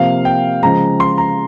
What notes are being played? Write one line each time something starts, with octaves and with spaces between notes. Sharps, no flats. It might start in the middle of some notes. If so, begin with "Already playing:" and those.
Already playing: C3 F3 A#3 F5
G5
C#3 F3 G#3 A#5
C6
A#5